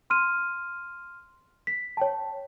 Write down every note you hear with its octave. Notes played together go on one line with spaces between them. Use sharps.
C6 F6 D#7
B6
C#5 G5 A5